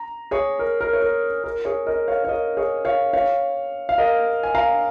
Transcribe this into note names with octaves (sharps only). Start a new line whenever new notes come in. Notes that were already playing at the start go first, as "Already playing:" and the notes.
Already playing: A#5
G#4 C#5
A#4
A#4
C#5
A#4
A#4
G#4 C#5
A#4 D#5
C#5 F5
C#5
A#4 D#5
G#4 C#5
C#5 F5
C#5 F5
F5
A#4 D#5
G#5
F5 A#5